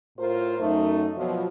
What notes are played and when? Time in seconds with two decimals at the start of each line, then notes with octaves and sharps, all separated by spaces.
0.19 A2 F4 A#4 C5
0.59 F#2 A3 D#4
1.16 B2 F3 F#3